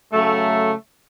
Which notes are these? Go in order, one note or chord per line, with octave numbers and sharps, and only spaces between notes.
C#3 F#3 A3